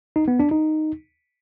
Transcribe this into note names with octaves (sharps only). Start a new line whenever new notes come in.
D#4
B3
D4
D#4